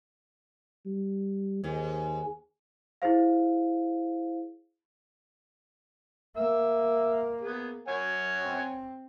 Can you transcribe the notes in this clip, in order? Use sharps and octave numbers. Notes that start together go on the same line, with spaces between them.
G3
D#2 G#2
E4 G#4 C5 F5
A#3 E5
B3 G#4
C#5 F#5 G#5
C4